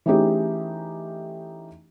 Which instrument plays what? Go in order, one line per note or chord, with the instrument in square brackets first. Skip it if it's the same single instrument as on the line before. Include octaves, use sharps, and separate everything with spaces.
[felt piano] E3 A3 C#4 D#4 G4 G#4